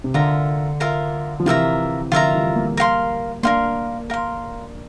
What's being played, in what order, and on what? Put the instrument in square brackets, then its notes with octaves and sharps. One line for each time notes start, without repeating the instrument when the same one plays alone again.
[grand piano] C3
[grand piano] D3 [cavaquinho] F4 A#4 E5 A#5
[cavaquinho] F4 A#4 E5 A#5
[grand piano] F3
[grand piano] C3 E3 [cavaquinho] F4 A#4 E5 A#5
[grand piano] D3 F3 [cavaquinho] F4 A#4 E5 A#5
[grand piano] E3 G3
G3 A#3
[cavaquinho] A#4 F5 C6
[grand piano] A#3 D4 [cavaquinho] A#4 F5 C6
[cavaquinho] A#4 F5 C6